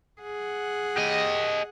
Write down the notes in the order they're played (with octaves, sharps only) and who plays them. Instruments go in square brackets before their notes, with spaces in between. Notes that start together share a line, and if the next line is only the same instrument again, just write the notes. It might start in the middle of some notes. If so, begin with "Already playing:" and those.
[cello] G#4 F#5
[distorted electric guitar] G4 D#5